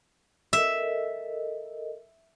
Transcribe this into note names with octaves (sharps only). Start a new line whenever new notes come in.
A4 A#4 D#5 E5